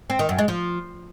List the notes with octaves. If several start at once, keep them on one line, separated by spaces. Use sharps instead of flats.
C4
D#3
F#2
G#3
F3